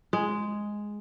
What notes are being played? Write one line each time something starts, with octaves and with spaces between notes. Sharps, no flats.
G#3